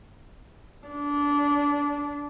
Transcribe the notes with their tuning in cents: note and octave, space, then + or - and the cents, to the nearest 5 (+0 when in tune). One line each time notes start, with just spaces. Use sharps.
D4 -20